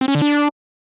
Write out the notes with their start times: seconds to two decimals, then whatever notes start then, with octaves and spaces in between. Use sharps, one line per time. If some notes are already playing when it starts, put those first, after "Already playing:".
0.01 C4
0.08 C#4
0.15 D3
0.22 D4